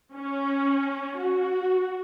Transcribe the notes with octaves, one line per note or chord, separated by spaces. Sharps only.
C#4
F#4